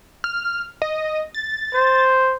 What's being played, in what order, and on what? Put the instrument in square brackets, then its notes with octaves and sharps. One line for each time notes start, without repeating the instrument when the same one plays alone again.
[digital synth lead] F6
D#5
A6
[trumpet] C5